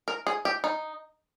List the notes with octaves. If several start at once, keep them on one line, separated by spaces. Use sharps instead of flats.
A#4
G#4
G4
D#4